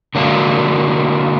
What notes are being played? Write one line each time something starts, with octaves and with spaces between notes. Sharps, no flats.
D3 F#3 A#3 D4